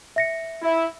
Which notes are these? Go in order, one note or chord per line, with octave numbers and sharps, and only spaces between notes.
E5 A#6 C#7
E4